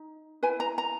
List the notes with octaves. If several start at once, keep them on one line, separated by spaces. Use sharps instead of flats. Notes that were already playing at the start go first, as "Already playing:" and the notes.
Already playing: D#4
E4 B4 G#5
A#5
A#5